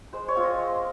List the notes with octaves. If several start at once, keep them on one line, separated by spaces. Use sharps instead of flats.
G#3 C5
C#5
C4 F4
D#5
G#3